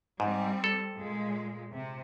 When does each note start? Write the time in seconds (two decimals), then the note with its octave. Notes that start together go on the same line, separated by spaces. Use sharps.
0.20 G#2 G3 C4
0.64 A4
0.93 A#2 G#3
1.71 C3